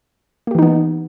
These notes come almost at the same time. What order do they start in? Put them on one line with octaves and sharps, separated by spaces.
A#3 G4 E3 D#4 B3